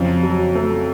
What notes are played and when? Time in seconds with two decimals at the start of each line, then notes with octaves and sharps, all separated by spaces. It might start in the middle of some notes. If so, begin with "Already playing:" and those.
Already playing: F2 C#3 F3 F#3
0.23 F#3
0.55 A3